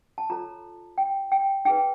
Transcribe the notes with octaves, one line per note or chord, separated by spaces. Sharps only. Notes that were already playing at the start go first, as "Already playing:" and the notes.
A5
F4 A4 C#5 A#5
G5
G5
D#4 G#4 B4 G5